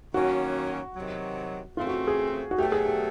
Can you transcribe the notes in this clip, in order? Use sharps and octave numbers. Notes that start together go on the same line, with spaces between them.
D#3 F#3 A#3 C#4 F#4
C3 D#3 F#3
C#3 E3 A3 C4 F4
F#4
G#4
F#4
B2 F#3 A3 G4
G#4
G4